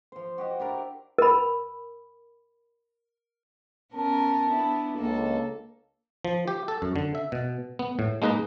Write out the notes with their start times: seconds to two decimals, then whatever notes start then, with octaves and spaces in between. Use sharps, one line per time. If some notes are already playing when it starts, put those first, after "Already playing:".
0.12 F3 C5
0.38 F#4 G4 D#5
0.60 D4 E4 A#4
1.18 A#4 B5
3.93 B3 C#4 A#4 A5
4.50 B3 D4 E4
4.98 C#2 A#3 A4
6.25 F3
6.48 G4
6.68 A4
6.82 F#2
6.96 D3
7.15 E5
7.32 B2
7.79 B3
7.99 A2
8.22 G#3 A#3 D#4 B4 D#5